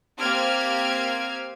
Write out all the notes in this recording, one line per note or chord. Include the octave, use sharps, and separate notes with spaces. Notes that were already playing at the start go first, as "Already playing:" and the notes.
A#3 C4 G4 F6 G#6